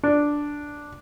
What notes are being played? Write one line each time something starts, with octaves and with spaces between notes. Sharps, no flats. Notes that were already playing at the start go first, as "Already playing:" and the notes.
D4